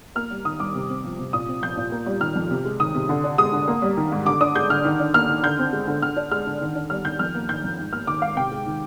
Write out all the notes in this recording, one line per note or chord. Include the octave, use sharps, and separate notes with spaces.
A#3 F6
G3
D#3 D#6
G2 D6
C3
C4
F3
C3
A#2 D#6
C4
F3 G6
A#2
A#3
G3
D#3 F6
F2
C3
G#3
D#3 D#6
C3
D3
D4
G#3 D#6
D3
A#3
G3
D#3
G#2
D3 D6
D4 D#6
G#3 G6
D3 F6
D#3
D4
A#3 F6
D#3
D3 G6
C4
G#3
D3
D3 F6
D4
G#3 F6
D3
D#3
D4
G3 F6
D#3 G6
F2 F6
A#3
D#3 G6
F2
G#2
A#3 F6
D#3 D6
G#2 F5
C3 G5
G#3
D#3